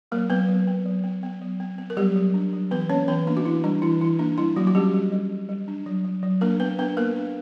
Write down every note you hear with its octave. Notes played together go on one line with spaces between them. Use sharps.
F#3 A#3 A#4
F#3 B3 B4
F#3
B3
F#3
B3
B3
F#3
B3
B3
A#4
F#3 G3 G4
F#3
D4
F#3
E3 B3 B4
A#3 C#4 C#5
E3 B3 B4
A#3 D4
F#4
E3 E4
G3 D4
E3 E4
E3 E4
A#3 D4
G3 E4
F#3 A#3 F#4
F#4
G3 C#4 G4
G3
G3
G3
G3
D4
F#3
F#3
F#3
A#3 D4 A#4
B3 B4
B3 D4 B4
A#3 B3 A#4
D4